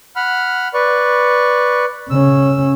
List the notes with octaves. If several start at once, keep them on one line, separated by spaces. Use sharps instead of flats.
F#5 B5 F6
B4 D5 C#6
C#3 C#4 E6